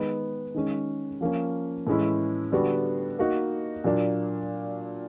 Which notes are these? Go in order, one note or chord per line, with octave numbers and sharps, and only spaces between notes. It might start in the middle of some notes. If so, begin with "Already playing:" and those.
Already playing: D#3 G#3 B3
D#3 G#3 C#4
F3 A#3 C#4
A2 E3 G#3 C#4 E4
D3 G3 B3 D4 F#4
A#3 D#4 F#4
A#2 F#3 A#3 D4